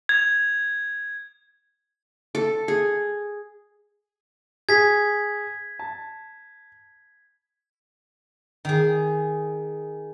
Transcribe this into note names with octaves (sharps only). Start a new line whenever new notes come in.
G#6
A4
G#4
G#4 G#6 B6
A5
D#3 G#4